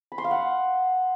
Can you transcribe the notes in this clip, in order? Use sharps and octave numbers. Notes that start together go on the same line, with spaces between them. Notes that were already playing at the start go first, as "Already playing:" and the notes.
B5
C6
F5
F#5